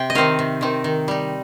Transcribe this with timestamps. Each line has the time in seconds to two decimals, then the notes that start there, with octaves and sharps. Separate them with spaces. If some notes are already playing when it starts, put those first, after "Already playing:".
Already playing: C3 G5
0.10 D#5
0.15 D#3 C4 D#4 F5
0.39 C3
0.61 D#3 C4 D#4
0.84 D#3
1.08 G3 D#4